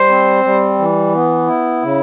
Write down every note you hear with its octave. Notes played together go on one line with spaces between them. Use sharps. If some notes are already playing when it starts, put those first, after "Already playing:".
Already playing: G3 C5
C4
G3
E3
B3
E4
C#3